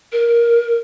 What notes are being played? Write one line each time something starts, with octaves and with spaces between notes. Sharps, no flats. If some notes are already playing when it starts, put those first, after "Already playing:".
A#4